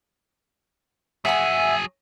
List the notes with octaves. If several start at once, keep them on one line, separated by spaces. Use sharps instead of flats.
F#3 G#4 E5 F#5 G#5